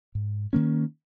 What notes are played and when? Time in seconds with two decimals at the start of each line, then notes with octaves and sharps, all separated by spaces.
0.15 G#2
0.53 D#3 A#3 C#4